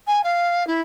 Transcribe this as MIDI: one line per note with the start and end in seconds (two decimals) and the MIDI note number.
0.07 0.21 80
0.24 0.66 77
0.67 0.81 64